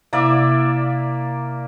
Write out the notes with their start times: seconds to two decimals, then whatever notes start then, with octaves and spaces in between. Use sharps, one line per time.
0.13 C3 A#3 E4 D5 E5 D6